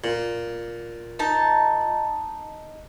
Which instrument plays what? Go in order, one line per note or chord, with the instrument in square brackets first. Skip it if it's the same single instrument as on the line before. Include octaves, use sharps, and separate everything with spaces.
[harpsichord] A#2
[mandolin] D#4 A5